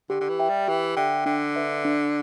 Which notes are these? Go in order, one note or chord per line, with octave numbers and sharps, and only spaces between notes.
D3 G4
D3
E3
E5 G5
G3
E3 G4
D3 E5 G5
D3 D4
B4 E5
D4